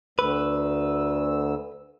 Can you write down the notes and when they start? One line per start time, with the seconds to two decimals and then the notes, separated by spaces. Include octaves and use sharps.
0.19 D2 B4 E6